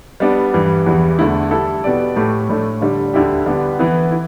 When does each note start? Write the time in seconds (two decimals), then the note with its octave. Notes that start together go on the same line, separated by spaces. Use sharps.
0.20 G3 B3 D4
0.54 G2 E3 G3
0.86 E2 E3 G3
1.19 E2 D3 A3 E4
1.51 G3 E4 A4
1.84 B2 B3 G4 D5
2.16 A2 A3 G4
2.49 A2 A3 D4
2.81 D3 G3 D4
3.14 D2 D3 G3 E4 G4
3.46 D3 G3 B3 G4
3.79 E3 B3 E4
4.12 E4